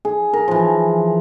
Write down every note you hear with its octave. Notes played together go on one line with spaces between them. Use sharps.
G#4
A#4
E3 F3